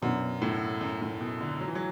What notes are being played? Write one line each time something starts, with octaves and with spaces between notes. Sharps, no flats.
F#2 B2 F#3 D4
A2
F#2
A2
B2
D3
F#3
E3
F#3